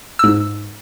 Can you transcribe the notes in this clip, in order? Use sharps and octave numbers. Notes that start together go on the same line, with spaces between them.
G#2 E6